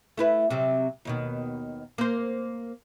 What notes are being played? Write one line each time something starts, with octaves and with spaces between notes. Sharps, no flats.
A3 E4 B4
C3 F#3 G3
D#2 B2 D#3
A#3 C5